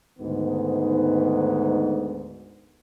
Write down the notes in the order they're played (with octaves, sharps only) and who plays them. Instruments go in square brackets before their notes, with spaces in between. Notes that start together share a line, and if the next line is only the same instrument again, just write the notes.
[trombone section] D2 G#2 D#3 B3